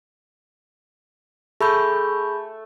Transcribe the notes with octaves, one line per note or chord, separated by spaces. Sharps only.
A3 G#4 B5 G6